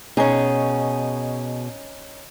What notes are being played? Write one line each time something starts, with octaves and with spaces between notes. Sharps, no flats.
B2 C#4 D#4 G#4